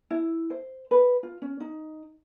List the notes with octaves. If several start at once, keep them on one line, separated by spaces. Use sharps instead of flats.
E4
C5
B4
F4
C#4
D#4